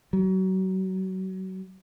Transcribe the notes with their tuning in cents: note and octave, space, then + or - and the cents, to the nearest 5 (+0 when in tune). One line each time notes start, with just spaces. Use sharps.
F#3 +30